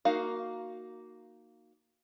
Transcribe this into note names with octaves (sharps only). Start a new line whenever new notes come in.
A#3 D#4 F#4 F5